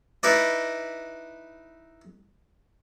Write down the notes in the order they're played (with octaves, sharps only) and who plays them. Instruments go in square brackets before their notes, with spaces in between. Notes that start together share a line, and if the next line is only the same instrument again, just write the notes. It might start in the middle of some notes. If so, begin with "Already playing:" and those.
[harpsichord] D#4 E4 B4 D5 D#5